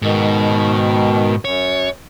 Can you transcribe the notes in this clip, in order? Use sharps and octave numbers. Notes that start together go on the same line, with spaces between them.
G#2 B2 D#3
F#2 C#5